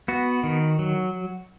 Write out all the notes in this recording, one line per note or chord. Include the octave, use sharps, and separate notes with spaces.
B3 F#4
D#3
F#3